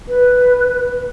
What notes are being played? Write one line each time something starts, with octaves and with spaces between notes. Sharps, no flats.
B4